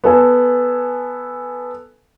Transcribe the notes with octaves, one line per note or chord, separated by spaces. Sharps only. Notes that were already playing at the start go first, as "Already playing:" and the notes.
B3 A4 G#5